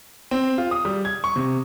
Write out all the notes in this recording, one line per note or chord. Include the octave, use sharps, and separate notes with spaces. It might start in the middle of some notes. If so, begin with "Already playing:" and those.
C4
F4
D#6
G3
G#6
C#6
C3